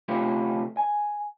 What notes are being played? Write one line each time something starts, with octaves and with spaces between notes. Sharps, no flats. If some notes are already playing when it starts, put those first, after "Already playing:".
C3 A3 C#4 F4 G4 B4
G#5